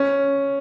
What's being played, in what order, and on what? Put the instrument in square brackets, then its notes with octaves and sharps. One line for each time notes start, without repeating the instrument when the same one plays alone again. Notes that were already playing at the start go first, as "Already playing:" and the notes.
Already playing: [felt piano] C#4